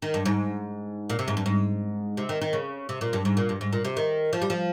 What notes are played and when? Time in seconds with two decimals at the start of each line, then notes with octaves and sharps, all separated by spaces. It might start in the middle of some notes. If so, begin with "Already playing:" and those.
0.02 D#3
0.14 G2
0.25 G#2
1.09 A#2
1.19 C3
1.28 G#2
1.37 G2
1.46 G#2
2.17 C3
2.29 D#3
2.41 D#3
2.53 C#3
2.89 C3
3.01 A#2
3.13 G2
3.25 G#2
3.37 A#2
3.49 G2
3.61 G#2
3.73 A#2
3.85 C3
3.97 D#3
4.33 F3
4.42 G3
4.50 F3